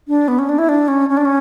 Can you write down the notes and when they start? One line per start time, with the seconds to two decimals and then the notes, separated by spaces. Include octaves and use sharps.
0.08 D4
0.28 B3
0.39 C#4
0.49 D4
0.59 E4
0.69 D4
0.88 C#4
1.09 C#4
1.17 D4
1.25 C#4